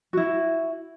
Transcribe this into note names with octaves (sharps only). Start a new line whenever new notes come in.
E4 F#4